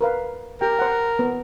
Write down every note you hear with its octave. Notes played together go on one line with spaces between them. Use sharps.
A#4 B4 F5
G4 A#4 G5
C5 F#5
B3